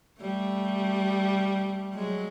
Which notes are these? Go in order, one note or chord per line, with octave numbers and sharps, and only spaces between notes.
G3 A3
F#3 G#3